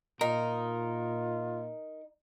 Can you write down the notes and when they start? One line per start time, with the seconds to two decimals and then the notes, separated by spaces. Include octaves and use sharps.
0.21 A#2 D#4 F4 A#4